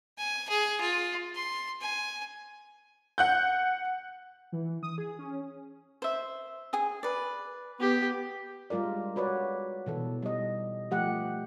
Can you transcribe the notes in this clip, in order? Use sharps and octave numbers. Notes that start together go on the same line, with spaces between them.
G#5
G#4
F4
C6
G#5
F#5 F#6 G6
E3
D#6
G#4
C#4
C5 E5
G#4 G#5 D#6
B4 D5
B3 G4
G3 G#3 F4 A#4 D5
F#4 B4 C#5 D5
B2 E3 A4
G3 D#5
F3 A3 G4 F#5